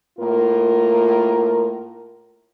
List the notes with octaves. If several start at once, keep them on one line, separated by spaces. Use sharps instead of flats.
A2 A#3 F4 A#4